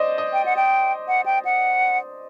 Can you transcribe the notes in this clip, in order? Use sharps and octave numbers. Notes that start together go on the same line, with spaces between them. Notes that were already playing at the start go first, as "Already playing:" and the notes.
Already playing: C5 D5 D#5
D#5
G5
F#5
G5
F#5
G5
F#5